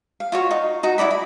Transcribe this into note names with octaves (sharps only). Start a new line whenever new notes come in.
F5
F4 F#4 C#5
D#4
D#4 F#4 A#5
E4 A4 D5 B5
B5